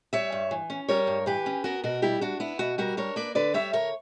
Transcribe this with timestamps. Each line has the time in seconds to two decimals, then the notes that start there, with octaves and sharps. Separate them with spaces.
0.13 G3 C#5 E5
0.32 G2
0.51 E3
0.70 C#4
0.88 G3 A#4 C#5
1.07 G2
1.26 E3 G4 B4
1.46 C#4
1.64 B3 F#4 A#4
1.84 B2 F#4 A#4
2.02 G3 E4 G4
2.21 D4 F#4
2.40 B3 E4
2.59 B2 F#4
2.78 G3 F#4 A#4
2.97 D4 A#4 C#5
3.16 A#3 B4 D5
3.35 D3 B4 D5
3.54 G3 C#5 E5
3.73 D3 A#4 C#5